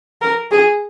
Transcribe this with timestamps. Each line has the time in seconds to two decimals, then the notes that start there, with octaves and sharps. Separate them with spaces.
0.22 A#4
0.51 G#4